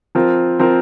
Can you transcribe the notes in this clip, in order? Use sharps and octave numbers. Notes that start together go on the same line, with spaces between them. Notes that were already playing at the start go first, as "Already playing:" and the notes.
F3 C4 F4 A#4
F3 C4 F4 A#4